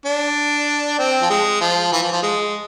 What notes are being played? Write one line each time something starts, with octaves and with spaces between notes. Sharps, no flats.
D4
C4
F3
G#3
F3
E3
F3
F3
G#3